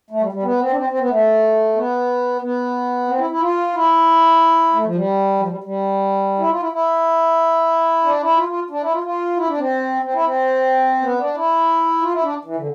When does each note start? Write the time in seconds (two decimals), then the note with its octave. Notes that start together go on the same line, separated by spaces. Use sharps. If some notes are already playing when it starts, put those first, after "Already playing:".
0.10 A3
0.22 G3
0.32 G3
0.43 B3
0.60 C4
0.72 D4
0.76 C4
0.90 C4
0.99 B3
1.09 A3
1.75 B3
2.42 B3
3.08 C4
3.18 E4
3.30 E4
3.41 F4
3.73 E4
4.73 A3
4.85 F3
4.95 G3
5.39 F3
5.48 G3
5.64 G3
6.39 E4
6.50 F4
6.60 E4
6.72 E4
8.04 D4
8.21 E4
8.37 F4
8.48 F4
8.70 D4
8.81 E4
8.92 F4
9.03 F4
9.37 E4
9.48 D4
9.58 C4
10.02 C4
10.14 E4
10.24 C4
11.02 B3
11.19 D4
11.35 E4
12.01 F4
12.12 E4
12.23 D4
12.45 E3
12.56 D3